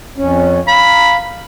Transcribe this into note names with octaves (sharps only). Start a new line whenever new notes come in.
F2 C#4
F5 A#5 B5